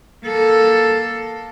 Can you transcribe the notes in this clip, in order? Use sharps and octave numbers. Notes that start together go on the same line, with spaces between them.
A#3 A4